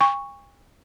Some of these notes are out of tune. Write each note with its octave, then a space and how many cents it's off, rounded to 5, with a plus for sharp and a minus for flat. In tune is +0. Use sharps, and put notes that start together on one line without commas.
G#5 -45 C#6 +0